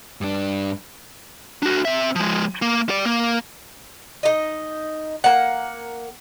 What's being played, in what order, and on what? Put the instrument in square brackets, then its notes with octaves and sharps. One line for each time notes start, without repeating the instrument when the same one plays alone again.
[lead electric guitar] G2 D4
D4 F#4
C4 E5
F3 G#3
A#3
G3 D5
A#3
[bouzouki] D#4 D#5
A#3 F#5